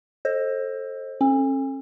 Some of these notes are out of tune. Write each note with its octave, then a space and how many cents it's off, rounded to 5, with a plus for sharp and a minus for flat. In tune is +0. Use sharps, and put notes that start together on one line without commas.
A4 +5 C5 +25 D#5 +0
C#4 -40 A4 +0